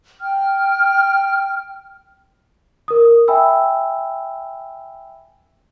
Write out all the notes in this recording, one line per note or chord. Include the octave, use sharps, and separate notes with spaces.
G5 F6
A#4 D#6
E5 G5 G#5 B5 E6